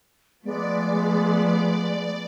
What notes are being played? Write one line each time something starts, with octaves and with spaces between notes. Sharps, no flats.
F3 G#3 A3 B3 D5